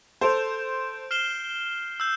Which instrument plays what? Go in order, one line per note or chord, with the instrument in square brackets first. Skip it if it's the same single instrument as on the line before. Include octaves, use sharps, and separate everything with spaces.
[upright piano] A4 C5 [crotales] G6 D7 F7
[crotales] F6 C7 E7 G7
E6 G6